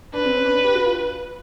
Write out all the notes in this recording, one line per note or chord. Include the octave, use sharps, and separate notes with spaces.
D4 B4
C4
C#4
D4
G4
F#4
F4